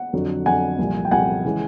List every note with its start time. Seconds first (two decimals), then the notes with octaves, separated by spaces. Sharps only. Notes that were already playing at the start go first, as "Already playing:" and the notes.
Already playing: F#5
0.13 F2 D3 F#3
0.46 F2 D3 F#3 F#5 G#5
0.79 C2 A#2 F3
1.05 G5
1.11 C2 A#2 F3 F#5 G#5
1.45 C#3 E3 G#3